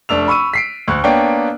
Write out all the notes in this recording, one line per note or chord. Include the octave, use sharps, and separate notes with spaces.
F1 A3 D4 E6 F7
B5 C#6 E6 D#7
B6 C7 D7
D2 C#6 F#6
A#3 B3 D4 C#5 G5